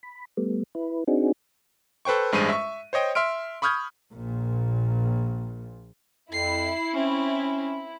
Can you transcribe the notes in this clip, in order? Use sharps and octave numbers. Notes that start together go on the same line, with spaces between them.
B5
G3 A3 B3
E4 B4
C4 D4 D#4 F#4 G#4
A4 B4 C5 G5 C#6
A1 G2 G#3 C5 D#7
E5 C#6
C5 C#5 D#5 G5
E5 C6 F6 D7
B5 C#6 D#6 F6 G6 G#6
A#1 A#2
F2 E4 C7
C4 C#4